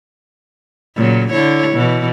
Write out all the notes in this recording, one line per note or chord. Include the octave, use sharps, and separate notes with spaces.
A#2 C#3 F#3
D3 E4 C#5
B2 E3